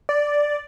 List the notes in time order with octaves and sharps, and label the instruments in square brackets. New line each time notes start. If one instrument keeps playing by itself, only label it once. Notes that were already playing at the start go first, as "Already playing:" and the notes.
[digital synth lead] D5